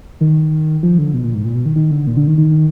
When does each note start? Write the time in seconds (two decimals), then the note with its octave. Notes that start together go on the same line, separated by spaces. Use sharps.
0.21 D#3
0.83 F3
0.98 D3
1.14 B2
1.24 A#2
1.34 G#2
1.45 A#2
1.55 B2
1.66 D#3
1.76 D#3
1.91 D3
2.07 A#2
2.17 D3
2.27 D#3
2.38 D#3